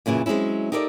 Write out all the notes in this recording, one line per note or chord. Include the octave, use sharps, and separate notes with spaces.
F#2 A#2 C#3 E3
F#3 G#3 C4 C#4 E4
D#4 G4 A4 A#4 C5 D5